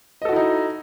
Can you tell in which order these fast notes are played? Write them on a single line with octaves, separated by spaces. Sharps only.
D#5 A4 F#4 E4 D#4